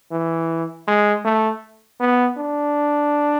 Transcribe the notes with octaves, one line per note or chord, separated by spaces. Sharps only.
E3
G#3
A3
B3
D4